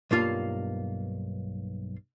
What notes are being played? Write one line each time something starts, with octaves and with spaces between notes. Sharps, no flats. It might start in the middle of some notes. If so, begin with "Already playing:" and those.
B1 G2 A#3 F4 F5